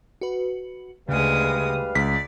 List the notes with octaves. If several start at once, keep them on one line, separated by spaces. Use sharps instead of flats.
F#4 B4
D2 C#3 G3 G#3 B4 F5 D#6
C#2 D5 B6